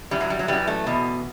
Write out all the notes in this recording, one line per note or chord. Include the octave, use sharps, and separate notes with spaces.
F#2 E3 G3
F#3
G3
F#3
F#2 E3 G3
A3
E2 B2